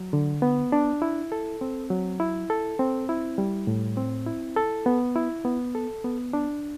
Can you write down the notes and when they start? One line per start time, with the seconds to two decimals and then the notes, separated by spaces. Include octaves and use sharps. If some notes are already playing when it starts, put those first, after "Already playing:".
Already playing: F#3
0.13 D3
0.42 B3
0.72 D4
1.02 E4
1.32 A4
1.61 C4
1.90 F#3
2.20 E4
2.50 A4
2.79 C4
3.09 E4
3.38 G3
3.67 A2
3.97 C4
4.26 E4
4.56 A4
4.86 B3
5.16 E4
5.45 B3
5.75 A4
6.04 B3
6.33 D4